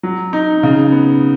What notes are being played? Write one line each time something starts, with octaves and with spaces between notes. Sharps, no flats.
F#3
D#4
C#3
B3